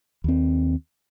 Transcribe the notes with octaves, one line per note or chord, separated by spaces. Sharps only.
D#2 C4